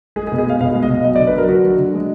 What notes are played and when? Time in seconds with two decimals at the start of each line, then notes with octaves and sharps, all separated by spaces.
0.16 G#3 G#4
0.27 G#4
0.32 B2
0.38 G#4
0.46 G#3 F5
0.61 B2 F5
0.75 G#3
0.82 D#5
0.90 B2
1.05 F#3 D#5
1.16 D5
1.19 D3
1.27 B4
1.34 F#3 A#4
1.49 D3 F#4
1.64 F#3
1.78 D3
1.94 G#3